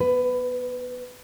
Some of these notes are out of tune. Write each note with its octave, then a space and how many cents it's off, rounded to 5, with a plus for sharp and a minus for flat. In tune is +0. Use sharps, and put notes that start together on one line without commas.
B3 -20 B4 +15